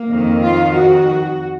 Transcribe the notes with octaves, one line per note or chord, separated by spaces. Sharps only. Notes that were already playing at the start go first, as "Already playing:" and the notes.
Already playing: A#3
F2 D#3
F4
F#4